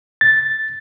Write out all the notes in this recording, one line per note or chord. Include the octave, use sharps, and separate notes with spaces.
A6